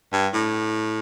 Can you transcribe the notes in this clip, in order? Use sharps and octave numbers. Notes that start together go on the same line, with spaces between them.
G2
A2